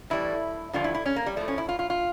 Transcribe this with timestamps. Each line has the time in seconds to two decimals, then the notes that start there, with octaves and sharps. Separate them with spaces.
0.10 A2 E3 G3 E4
0.73 G2 D3 F3 F4
0.84 E4
0.95 E4
1.06 C#4
1.16 A#3
1.26 G3
1.37 A2 F3 A3
1.48 C#4
1.58 E4
1.69 F4
1.79 F4
1.90 F4